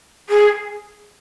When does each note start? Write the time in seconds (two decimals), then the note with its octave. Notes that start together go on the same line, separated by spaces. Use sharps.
0.29 G#4